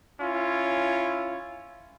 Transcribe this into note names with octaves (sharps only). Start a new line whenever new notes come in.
C#4 E4 F4